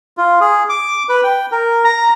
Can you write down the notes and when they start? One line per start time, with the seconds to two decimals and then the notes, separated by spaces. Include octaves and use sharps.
0.17 F4
0.40 G#4
0.69 D6
1.09 B4
1.24 G5
1.52 A#4
1.84 A#5